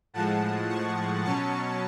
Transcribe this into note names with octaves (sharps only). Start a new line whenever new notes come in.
A2 F3 G#3 F#5 A5
A5 C#6
B2 F#3 C#4 A5 C#6